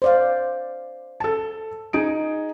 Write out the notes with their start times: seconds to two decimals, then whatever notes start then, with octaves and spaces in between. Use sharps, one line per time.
0.02 C5 D5 F5
1.20 A4 A5
1.93 D#4 G#4 D7